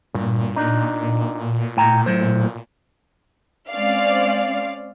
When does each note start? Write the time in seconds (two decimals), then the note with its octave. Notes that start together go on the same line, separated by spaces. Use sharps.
0.15 G2 A#2
0.56 D4 D#4
1.77 A2 G5 A#5
2.06 A2 F#3 C5
3.71 G#3 C4 C#4 D5 F5